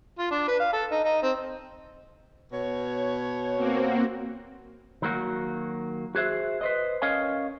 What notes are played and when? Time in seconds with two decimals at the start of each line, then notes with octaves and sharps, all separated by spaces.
0.18 F4
0.31 D4
0.48 B4
0.60 F5
0.73 A4
0.91 D#4
1.04 D#4
1.22 C4
2.52 B2 C#5
3.55 A#3 C4 F#4
5.02 D#3 F#3 A#3 F#4
6.15 F#4 G#4 C5 E5
6.61 B4 C5 D#5
7.02 C#4 A#4 C#5 D#5 F5 G#5